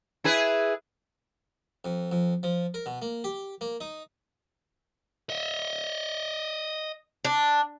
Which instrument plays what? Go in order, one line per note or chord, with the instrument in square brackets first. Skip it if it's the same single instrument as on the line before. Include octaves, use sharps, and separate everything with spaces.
[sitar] E4 G#4 B4
[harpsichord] F2
F2
F3
A#4
B2
A#3
G4
A#3
D#4
[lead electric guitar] D#5 E5
[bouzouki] D4